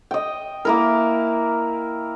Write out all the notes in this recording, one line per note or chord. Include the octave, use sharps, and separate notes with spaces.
D#5 G5
A#3 E4 A#4